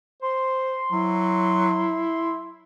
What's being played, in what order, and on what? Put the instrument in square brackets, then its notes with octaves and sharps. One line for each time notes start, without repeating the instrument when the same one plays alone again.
[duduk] C5 [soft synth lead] C6
[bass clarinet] F#3 [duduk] E4